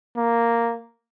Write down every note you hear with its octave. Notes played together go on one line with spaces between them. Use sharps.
A#3